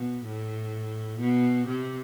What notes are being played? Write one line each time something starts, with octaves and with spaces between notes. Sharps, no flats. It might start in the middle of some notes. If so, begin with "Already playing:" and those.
Already playing: B2
A2
B2
C3